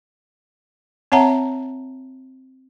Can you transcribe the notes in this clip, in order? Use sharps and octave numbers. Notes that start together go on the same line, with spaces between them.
C4 C#5 E5 F#5 A5 A#5